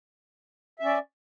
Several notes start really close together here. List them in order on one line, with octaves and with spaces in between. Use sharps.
E5 C#4 D5